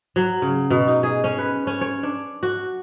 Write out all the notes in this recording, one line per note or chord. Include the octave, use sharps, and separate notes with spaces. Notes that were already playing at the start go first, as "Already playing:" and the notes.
F#3
C#3
B2
D#4
G#4
C#4
B4
C#4
C#5
D4
F#4